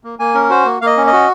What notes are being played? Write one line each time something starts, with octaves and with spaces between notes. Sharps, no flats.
A#3
A#3 G#5
C#4 A#4
F#4 C5
A#3
A#3 F5
D#5
C#4
D#5
F#4